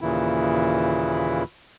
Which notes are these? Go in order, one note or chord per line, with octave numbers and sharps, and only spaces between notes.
D#2 A#2 C#3 E3 E4